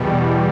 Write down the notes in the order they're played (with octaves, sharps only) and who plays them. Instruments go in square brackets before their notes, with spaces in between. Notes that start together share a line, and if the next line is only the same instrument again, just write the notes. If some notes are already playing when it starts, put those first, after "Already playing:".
Already playing: [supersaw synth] E2 B2 G3